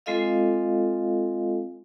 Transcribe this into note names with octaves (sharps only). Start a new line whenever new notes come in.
G#3 C4 F4 A4 D#5 F5